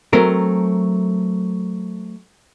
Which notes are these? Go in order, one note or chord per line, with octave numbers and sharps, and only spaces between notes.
F#3 A3 C4 A#4